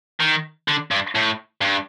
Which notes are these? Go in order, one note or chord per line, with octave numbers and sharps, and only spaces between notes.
D#3
D3
G2
A2
G2